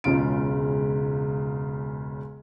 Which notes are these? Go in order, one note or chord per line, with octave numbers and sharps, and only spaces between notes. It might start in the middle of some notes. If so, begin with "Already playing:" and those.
E1 C#2 C#3 F4 D7